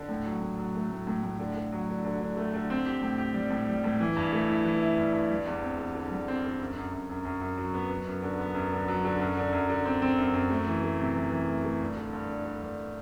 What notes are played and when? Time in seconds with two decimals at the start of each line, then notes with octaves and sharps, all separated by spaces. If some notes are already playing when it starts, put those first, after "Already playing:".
Already playing: D3
0.09 A2
0.26 F#3
0.42 A2
0.58 F#3
0.75 A3
0.91 A2
1.07 A2
1.23 A2
1.39 D3
1.56 D3
1.72 F#3
1.89 D3
2.05 D3
2.21 D3
2.37 A3
2.54 D3
2.70 C4
2.86 G4
3.02 A2
3.18 G4
3.34 G3
3.51 A2
3.68 G3
3.84 A2
4.00 E3
4.17 G2
4.33 A3
4.48 E4
4.65 E3
4.82 E4
4.98 G2
5.13 G2
5.29 G3
5.46 E2
5.62 C4
5.78 E2
5.95 D3
6.11 G3
6.28 C4
6.44 D3
6.60 F#2
6.77 F#2
6.93 F#2
7.10 F#2
7.25 F#2
7.41 F#2
7.58 F#3
7.74 B3
7.90 B3
8.07 F#2
8.23 D3
8.39 B3
8.55 F#2
8.72 D3
8.88 F#3
9.05 D3
9.20 F#2
9.37 D3
9.53 F#2
9.69 D3
9.86 C4
10.02 C4
10.18 F#2
10.34 F#2
10.50 A3
10.67 E3
10.83 A3
10.99 C3
11.16 E3
11.31 E3
11.48 A3
11.64 A3
11.81 G2
11.97 D3
12.13 G2
12.29 D3
12.45 D3
12.62 G2